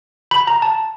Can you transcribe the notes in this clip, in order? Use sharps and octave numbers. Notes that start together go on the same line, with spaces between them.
B5
A#5
A5